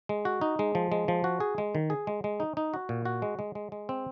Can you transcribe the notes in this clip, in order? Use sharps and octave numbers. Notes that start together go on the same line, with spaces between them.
G#3
F#4
D#4
G#3
F3
G#3
F3
F#4
G#4
G#3
D#3
G#4
G#3
G#3
D#4
D#4
F#4
A#2
F#4
G#3
G#3
G#3
G#3
C4